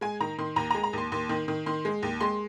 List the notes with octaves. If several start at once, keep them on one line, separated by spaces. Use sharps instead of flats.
G#3 G#5
D#3 A#5
D#3 C6
D#2 A#5
A#5
G#3
A#5
D#2 C6
D#2 C6
D#3
D#3
D#3 C6
G#3
D#2
G#3 C6